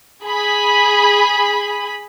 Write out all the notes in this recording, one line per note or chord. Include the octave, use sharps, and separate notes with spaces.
G#4 B5